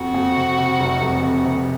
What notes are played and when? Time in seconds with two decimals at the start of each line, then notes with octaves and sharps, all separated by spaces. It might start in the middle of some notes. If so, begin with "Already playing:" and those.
Already playing: F2 F#4
0.14 F2
0.36 C3
0.58 C3
0.80 F1
1.02 F1
1.23 C3
1.45 C3